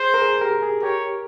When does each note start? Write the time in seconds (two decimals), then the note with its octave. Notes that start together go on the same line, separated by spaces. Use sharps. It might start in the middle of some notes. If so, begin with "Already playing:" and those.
Already playing: G#4 C5
0.14 A#4
0.22 G#4
0.41 G4 A#4
0.63 G#4
0.82 G4 A#4 C#5